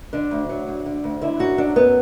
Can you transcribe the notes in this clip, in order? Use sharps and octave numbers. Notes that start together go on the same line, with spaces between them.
D3 D4
D2
F#3
D2
D3
D2
D3 E4
F#2 F#4
F#3 D4
F#2 B3